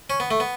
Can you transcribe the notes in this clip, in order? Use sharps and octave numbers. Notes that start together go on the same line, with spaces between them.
C#4
B3
A3
B3